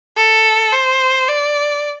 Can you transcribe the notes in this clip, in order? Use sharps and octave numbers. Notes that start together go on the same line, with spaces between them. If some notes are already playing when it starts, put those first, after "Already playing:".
A4
C5
D5